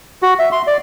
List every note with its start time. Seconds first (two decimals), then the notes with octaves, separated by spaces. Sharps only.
0.23 F#4
0.39 E5
0.52 C6
0.67 D5